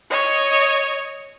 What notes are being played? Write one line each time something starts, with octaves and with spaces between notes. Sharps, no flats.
C#5 D#5